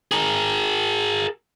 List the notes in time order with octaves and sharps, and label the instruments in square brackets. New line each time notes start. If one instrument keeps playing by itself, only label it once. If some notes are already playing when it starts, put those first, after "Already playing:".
[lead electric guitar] G#4 A#4